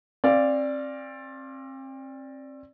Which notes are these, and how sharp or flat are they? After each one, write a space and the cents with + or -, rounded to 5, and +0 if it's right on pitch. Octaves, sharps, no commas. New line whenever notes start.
C4 +35 D5 +0 F5 -10